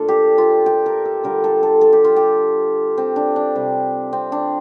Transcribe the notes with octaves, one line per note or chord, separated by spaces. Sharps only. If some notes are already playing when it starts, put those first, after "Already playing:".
Already playing: A#2 F3 A3 D4 F4 A4
G4
F4
G4
A#4
A4
D3 G3 A#4
A4
A4
A4
G4
F4
G4
C4
D4
D4
C3 G3
C4
D4